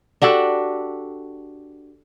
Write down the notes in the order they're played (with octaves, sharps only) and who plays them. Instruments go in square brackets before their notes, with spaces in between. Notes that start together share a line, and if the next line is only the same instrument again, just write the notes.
[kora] D4 F#4 G4 A4